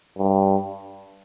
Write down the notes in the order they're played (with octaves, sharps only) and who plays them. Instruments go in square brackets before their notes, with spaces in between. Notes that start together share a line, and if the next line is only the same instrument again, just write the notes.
[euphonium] G2